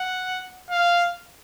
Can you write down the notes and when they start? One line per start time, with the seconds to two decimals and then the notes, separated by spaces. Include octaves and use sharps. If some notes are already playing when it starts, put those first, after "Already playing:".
Already playing: F#5
0.71 F5